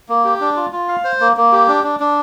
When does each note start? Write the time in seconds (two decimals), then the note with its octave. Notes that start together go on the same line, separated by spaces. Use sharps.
0.09 A#3
0.24 G4
0.41 D4
0.56 F4
0.72 F4
0.88 F5
1.04 C5
1.20 A#3
1.37 A#3
1.52 G4
1.68 D4
1.84 D4
2.00 D4